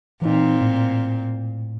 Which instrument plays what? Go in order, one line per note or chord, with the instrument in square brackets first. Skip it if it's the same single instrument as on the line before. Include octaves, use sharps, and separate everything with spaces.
[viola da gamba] A#2 C4 [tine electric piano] E3 D#4
[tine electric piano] A2